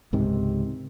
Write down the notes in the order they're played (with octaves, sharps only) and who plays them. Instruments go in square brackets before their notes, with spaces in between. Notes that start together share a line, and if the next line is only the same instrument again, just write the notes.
[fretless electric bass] C#2 G#2 C3 D#3